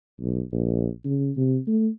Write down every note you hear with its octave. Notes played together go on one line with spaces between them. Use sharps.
B1
A#1
C#3
C3
A3